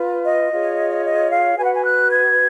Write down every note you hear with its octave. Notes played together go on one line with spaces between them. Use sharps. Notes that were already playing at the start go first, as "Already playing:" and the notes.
Already playing: F4 B4
D#5
F4 G#4 C#5
D#5
F5
F#4 B4 G#5
F#5
G#5
F#6
G#6